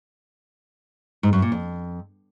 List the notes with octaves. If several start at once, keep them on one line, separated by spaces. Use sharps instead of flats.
G#2
F#2
A#2
F2